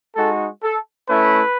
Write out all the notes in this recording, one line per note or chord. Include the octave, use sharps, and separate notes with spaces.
G#3 D#4 F#4 A4
A4
A3 C#4 E4 B4